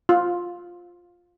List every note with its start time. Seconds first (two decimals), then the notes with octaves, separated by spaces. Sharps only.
0.09 F4